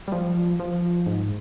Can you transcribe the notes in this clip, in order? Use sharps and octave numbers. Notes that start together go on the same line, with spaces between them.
G3
F3
F3
G#2